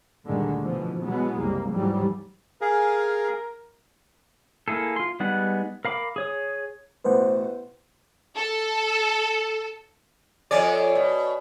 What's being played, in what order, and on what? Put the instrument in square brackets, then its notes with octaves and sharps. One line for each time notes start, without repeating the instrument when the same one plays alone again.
[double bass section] D2 G2 A#2 D3 D#3 G#3
B2 E3 F3
B2 E3 F#3 G#3 B3
F#1 C2 G3 A#3
D2 G#2 E3 F#3 G3
[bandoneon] G#4 [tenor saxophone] A#4 [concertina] F5 G#5
[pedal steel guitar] A#3 E4 G#4 A4
F4 C6
G3 G#3 B3 D#4 F#5
A#4 F5 B5 D6
G#4 C#5 D#6
[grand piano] A1 B2 [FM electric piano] B4 C5 F#5
[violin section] A4
[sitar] F2 C#4 D5
B2